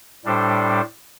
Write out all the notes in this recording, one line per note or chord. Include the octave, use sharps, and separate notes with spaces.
A2 G3 D4 A4 C5